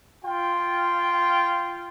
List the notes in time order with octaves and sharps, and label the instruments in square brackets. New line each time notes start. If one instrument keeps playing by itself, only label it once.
[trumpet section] F4 G5